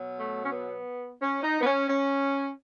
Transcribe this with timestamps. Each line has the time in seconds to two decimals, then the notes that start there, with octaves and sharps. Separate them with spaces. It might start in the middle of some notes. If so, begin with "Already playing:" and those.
Already playing: B2 F#3
0.17 A3
0.44 C#4
0.52 B3
1.20 C#4
1.43 D#4
1.61 B3
1.65 C#4
1.88 C#4